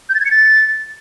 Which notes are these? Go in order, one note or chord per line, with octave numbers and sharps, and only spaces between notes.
G6
A6
G#6
C#7
A6